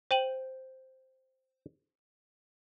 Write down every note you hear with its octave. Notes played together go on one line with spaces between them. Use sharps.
C5 G5 D#7 F#7